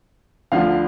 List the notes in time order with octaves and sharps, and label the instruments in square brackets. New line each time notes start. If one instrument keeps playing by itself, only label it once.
[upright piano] D2 D3 F3 F5